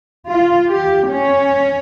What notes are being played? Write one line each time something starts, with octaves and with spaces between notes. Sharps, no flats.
F4
G4
C#4